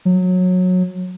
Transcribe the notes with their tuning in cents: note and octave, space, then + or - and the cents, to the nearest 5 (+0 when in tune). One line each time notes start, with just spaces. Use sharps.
F#3 -20